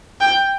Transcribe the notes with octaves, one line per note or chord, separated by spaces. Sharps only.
G5